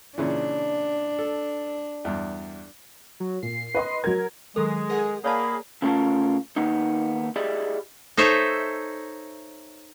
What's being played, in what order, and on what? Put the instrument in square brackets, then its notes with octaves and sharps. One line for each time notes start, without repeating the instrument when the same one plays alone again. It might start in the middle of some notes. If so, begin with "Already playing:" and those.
[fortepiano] A#2 C#3 E3 [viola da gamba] D4
[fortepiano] A4
E2 G2
[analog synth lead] F#3
[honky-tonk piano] A#2 [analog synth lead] C7
[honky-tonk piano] B4 D#5 C6
[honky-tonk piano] F#3 G#6 [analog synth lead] A#4
[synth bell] D#3 F#3 A#4 [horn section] G#3 [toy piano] A4
[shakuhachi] G#4 [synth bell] A#4 F#5
[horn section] A#3 G#4 [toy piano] C#5 D5 A5 [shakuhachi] B5
[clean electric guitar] C#3 A3 C#4 F4 A#4 A5
D#3 A#3 B3 D#4
E4 G4 G#4 D5 D#5
[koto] D#4 A4 C5 C#5 E5